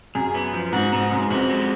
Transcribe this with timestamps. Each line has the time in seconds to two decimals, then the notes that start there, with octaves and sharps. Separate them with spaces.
0.15 F#2 G#4
0.34 B3
0.54 F3
0.72 G#2 F#4
0.92 G#2 B3
1.11 F#2 G#3
1.30 F2 F#4
1.50 G#3